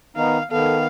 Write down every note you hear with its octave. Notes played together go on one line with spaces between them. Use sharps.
D#3 B3 D#4 F5
D#3 B3 A4 F5